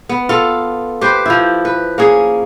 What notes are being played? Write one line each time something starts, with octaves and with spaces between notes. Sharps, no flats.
B3
F4 A4
G4 B4 C5
F3 E4
B4
A#3 C#4 G#4